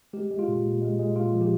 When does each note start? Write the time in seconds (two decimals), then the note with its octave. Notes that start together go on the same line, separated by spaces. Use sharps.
0.13 G#3 G4
0.31 G#3
0.39 F4
0.48 A#2
0.65 A#2
0.81 G#3
0.99 G#3
1.16 A#2 F4
1.34 F3
1.41 G4